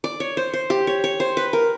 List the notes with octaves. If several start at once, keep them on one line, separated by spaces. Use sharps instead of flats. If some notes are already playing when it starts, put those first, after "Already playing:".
D5
C#5
C5
C5
G4
C#5
C#5
C5
B4
A#4